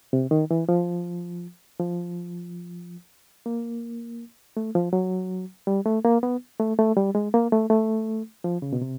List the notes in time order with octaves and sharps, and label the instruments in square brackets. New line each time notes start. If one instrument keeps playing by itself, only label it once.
[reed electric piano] C3
D#3
E3
F3
F3
A#3
A3
F3
F#3
G3
A3
A#3
B3
A3
A3
G3
G#3
A#3
A3
A3
F3
C#3
B2
C3